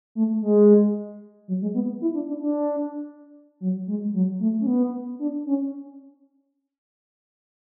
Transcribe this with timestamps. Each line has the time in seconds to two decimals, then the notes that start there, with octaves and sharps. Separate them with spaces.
0.15 A3
0.42 G#3
1.48 F#3
1.61 G#3
1.74 B3
2.01 E4
2.14 D4
2.28 D4
2.40 D4
3.60 F#3
3.87 G#3
4.13 F#3
4.40 A3
4.60 C#4
4.67 B3
5.19 D4
5.46 C#4